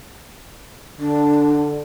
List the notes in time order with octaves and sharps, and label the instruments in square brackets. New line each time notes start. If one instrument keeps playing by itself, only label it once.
[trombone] D3 [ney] D4